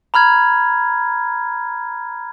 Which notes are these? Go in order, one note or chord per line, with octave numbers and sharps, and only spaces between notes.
A#5 B5 F6 G#6